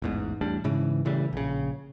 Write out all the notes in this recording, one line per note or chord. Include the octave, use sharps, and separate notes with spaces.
A1 E2 G#2
E2 A2 G3 D4
G#2 C#3 E3
A2 C#3 E3 G3
A#1 C#3